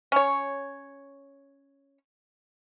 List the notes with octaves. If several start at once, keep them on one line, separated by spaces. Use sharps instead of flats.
C#4 C#5